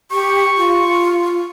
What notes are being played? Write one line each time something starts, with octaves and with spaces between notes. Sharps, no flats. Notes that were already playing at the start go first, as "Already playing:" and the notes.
G4 C#6
F4